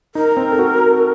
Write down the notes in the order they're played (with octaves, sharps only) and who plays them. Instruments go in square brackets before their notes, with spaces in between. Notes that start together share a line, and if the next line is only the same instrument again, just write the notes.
[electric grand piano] D#4 [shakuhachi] A#4
[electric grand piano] C4
A4
F#4